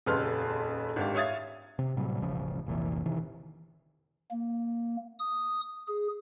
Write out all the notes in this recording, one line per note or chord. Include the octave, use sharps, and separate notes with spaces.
D#1 F2 C#3 B4 C6 F6
G#1 D4 G4 F5
C#5 E5 F5 D#6 G#6 A6
C3
A2 C3 F#3 G3
E1 A1 C#3 F3
F1 C2 A#2 E3
C3 D#3 E3
A#3
D#6
G#4